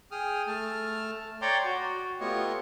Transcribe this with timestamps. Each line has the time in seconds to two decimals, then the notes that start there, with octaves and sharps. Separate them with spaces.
0.11 G#4 G5 D#6 F6
0.47 A3 A5 F6
1.42 C#5 D5 G5 A#5 C6 D6
1.65 F#4
2.20 A3 B3 F4 G4 C#5 D#5